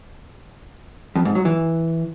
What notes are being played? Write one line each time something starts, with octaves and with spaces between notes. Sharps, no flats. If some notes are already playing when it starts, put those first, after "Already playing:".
F2
G#2
F#3
E3